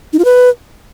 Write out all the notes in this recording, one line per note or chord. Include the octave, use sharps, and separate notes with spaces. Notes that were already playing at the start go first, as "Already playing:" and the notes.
D#4
F4
B4